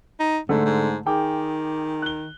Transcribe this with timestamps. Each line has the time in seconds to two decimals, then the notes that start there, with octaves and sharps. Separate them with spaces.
0.19 D#4
0.49 G#2 D3 A3
0.65 G#2
1.06 D#3 G#4 G5 D6
2.02 F#6 G7